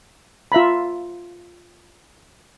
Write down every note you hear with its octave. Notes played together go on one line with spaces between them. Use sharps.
F4 E5 A#5 B5